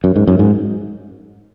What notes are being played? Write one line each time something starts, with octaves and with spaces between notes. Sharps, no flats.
F#2
G#2
F#2
G#2